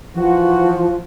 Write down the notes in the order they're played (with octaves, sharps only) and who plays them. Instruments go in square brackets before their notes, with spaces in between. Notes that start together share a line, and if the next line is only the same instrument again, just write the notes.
[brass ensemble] E3 F#4 [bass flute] F3